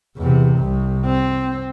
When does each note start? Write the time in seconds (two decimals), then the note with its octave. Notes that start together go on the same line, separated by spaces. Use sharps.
0.17 E2 C3
0.57 C2
1.05 C4